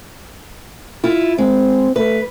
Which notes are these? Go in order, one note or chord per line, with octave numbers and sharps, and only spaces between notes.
E4 F4
G#3 C4
A3 B4